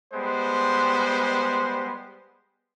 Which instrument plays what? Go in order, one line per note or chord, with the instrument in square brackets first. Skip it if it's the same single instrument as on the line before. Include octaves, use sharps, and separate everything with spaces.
[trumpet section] G3 G#3 B3 C5